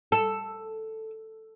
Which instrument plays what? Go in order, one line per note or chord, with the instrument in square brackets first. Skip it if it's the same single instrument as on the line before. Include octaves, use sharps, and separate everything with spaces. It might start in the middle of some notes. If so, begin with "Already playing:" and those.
[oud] A4